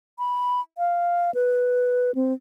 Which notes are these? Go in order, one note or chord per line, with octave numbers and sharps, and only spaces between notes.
B5
F5
B4
C4